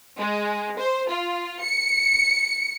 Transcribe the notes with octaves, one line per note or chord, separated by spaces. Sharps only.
G#3
C5
F4
C#7